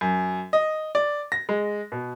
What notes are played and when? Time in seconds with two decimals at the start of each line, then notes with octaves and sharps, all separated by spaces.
0.01 F#2
0.53 D#5
0.95 D5
1.32 A#6
1.49 G#3
1.92 B2